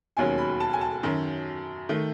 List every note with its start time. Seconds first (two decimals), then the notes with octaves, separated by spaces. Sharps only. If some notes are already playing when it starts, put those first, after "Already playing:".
0.17 E1 D#2 D#3 F#3 C#4 G#5
0.38 B5
0.60 A5
0.73 G#5
0.81 A5
1.03 F#2 D#3 F#3 C#4
1.89 D#3 A3